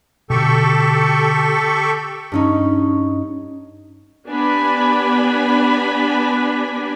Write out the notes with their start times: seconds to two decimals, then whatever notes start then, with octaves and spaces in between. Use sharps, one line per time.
0.30 B2 D3 G4 A4 C#6
2.32 G2 C#4 D#4
4.28 B3 D4 G4 D5 G#5 B5